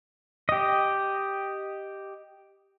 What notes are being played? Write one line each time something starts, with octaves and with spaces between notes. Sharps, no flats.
G4 D#5